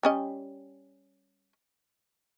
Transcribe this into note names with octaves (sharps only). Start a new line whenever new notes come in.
G3 C#4 D#5